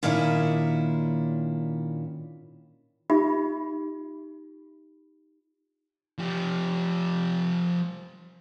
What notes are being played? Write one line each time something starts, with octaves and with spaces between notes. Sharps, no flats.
A#2 D#3 C#4 D4 E4
D#4 F4 G4 E5 B5
F3 G4